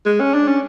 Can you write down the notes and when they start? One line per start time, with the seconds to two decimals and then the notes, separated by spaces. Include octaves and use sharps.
0.06 G#3
0.20 C#4
0.34 D4
0.48 C#4